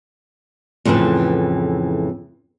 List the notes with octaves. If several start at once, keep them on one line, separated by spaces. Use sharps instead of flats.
F2 A2 C#3 E3 B4